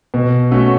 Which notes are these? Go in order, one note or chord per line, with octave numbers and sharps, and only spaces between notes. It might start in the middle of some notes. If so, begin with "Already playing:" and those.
B2
A3 C#4 F#4 A4